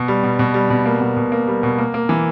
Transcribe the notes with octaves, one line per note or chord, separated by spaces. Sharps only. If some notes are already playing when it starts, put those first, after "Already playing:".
Already playing: B2
G3
B2
B2
G3
B2
A#3
B2
B2
A#3
G3
B2
A#3
A#3
E3